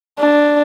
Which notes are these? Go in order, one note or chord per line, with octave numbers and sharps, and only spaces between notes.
D4